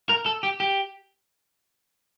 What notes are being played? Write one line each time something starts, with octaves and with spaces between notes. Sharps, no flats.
A#4
A4
G4
G4